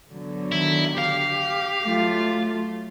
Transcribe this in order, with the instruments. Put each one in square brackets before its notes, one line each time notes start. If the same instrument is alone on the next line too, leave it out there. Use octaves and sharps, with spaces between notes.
[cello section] D3 F#3 B3
[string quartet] D#3 [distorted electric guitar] E4
[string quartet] G4 [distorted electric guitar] F5
[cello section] F#3 A3 F4